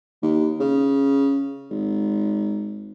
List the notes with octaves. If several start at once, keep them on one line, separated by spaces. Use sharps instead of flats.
D#2
C#3
G#1